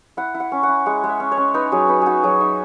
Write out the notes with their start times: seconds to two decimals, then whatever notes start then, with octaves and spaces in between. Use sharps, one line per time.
0.17 E4 F#5
0.34 E4
0.40 F#5
0.52 C#4
0.63 F#5
0.69 E4
0.86 G#3 F#5
1.04 G#3
1.09 E5
1.20 C#4
1.32 C#5
1.37 C#4
1.54 D#4 B4
1.72 F#3 G#4
1.89 D#4 B4
2.02 D#4 F#4 G#4
2.23 F#3 G#4
2.40 D#4 E5